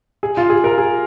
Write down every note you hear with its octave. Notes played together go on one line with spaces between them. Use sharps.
G#4
F4
G#4
A#4
G#4